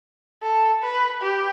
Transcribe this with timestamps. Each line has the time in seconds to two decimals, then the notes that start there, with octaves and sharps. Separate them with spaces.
0.43 A4
0.82 B4
1.22 G4